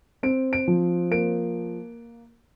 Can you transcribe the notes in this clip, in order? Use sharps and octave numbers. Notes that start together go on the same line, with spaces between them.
C4 D7
D7
F3
A#3 D7